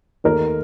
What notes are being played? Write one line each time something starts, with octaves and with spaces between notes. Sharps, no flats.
D#2 D#3 A3 A#4